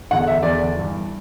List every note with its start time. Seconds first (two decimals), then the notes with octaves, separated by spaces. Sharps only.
0.11 E2 D3 F#5
0.27 E5
0.43 E2 D3 D5
0.75 G2 E3